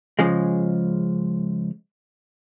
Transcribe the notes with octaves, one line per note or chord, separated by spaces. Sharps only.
C#3 F3 G#3